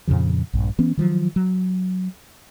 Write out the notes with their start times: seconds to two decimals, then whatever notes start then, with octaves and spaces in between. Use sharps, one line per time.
0.07 F2 A#2 C#3 F3
0.53 A#1 G2
0.79 E3 B3 C#4
0.97 D#3 F3 F#3
1.36 F#3